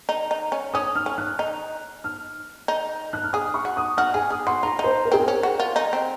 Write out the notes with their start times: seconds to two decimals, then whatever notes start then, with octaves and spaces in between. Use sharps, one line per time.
0.09 D#4
0.31 D#4
0.52 C#4
0.74 C#4 D#6
0.95 F6
1.06 C#4
1.18 F#6
1.39 D#4
2.04 F6
2.68 D#4
3.13 F#6
3.24 F6
3.33 G#4 D#6
3.54 C#6
3.65 F#4
3.77 D#6
3.97 F#4 F6
4.14 G#4 G#5
4.30 G#4 D#6
4.47 F#4 C6
4.63 F4 A#5
4.79 D#4
4.84 C5
5.05 A#4
5.12 C4 G#4
5.20 A#4
5.28 C#4
5.43 F#4
5.60 F4
5.76 D#4
5.93 C4